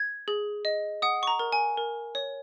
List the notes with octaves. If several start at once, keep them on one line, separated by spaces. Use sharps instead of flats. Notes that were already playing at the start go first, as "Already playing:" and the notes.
Already playing: G#6
G#4
D#5
F#5 D#6
C#6
A#5
A#4
G#5
A#4
C#5